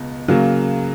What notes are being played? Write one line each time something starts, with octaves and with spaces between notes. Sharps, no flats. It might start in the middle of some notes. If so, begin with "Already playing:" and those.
Already playing: C#2 B2
C#3 F#3 A#3